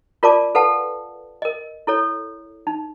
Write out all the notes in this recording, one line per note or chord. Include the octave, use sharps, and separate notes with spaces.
F4 A#4 D5 A5 D6
A4 B4 F5 F#5 A5
A#4 D#5
E4 A4 C#5
D#4